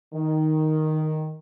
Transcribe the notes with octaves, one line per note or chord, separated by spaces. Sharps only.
D#3